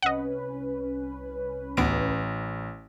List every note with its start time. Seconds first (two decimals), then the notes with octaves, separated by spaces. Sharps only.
0.02 C2 C#4 B4 D#5 F#5
1.77 A1 D2 B3 D7